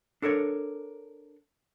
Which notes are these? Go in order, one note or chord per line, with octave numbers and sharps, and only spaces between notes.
D4 A4 A#4 C#5